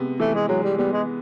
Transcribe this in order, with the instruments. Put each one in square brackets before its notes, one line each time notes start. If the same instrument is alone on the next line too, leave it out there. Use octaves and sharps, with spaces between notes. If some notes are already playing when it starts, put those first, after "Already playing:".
Already playing: [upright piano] C3 G#3 B3
[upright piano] E3 [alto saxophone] A3
[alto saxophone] G#3
[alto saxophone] F#3 [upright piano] G#3
[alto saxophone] G3
[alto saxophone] G3 [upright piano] B3
[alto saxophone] G#3